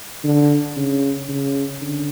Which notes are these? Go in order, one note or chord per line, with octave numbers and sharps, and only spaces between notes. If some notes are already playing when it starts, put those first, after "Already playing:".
D3
C#3
C#3
D3